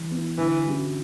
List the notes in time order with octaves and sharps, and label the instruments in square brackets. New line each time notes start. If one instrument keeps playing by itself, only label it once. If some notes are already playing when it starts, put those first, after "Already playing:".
Already playing: [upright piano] E3
B3 E4
[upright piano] D3 [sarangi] E3
[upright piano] F#3 C#4 F#4